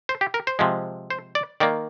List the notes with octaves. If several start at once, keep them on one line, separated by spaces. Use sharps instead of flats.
C5
G4
A#4
C5
C3 F3 G#3
C5
D5
D#3 A#3 D5